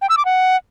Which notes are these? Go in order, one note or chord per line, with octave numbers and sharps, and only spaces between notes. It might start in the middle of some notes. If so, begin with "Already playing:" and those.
G5
E6
D6
F#5